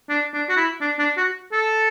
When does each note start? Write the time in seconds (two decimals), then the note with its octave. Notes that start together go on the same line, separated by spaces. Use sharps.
0.09 D4
0.33 D4
0.49 F#4
0.57 E4
0.81 D4
0.99 D4
1.17 F#4
1.52 A4